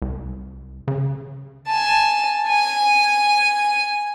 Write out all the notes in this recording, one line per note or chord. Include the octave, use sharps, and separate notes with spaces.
C2
C#3
G#5 A5
G#5